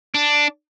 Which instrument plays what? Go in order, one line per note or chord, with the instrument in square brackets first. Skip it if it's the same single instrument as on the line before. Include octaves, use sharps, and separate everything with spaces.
[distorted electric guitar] D4